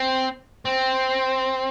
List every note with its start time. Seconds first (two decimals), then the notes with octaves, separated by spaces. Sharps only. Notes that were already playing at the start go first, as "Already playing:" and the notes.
Already playing: C4
0.65 C4